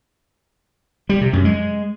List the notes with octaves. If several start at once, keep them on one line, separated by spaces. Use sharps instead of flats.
G3
C3
F#2
G#3